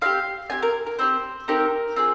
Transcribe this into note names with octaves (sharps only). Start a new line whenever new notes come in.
C4 D#4 G4 F5
C4 D#4 G4 G#5
A#4
A#4
C4 D#4 G4 C5
C4 D#4 G4 A#4
C4 F4 G#4